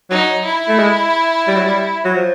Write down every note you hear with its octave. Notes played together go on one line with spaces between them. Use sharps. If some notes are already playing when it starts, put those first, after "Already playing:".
F#3 D#4
E4
A3
G#3
G3
F#3
G3
F#3
F3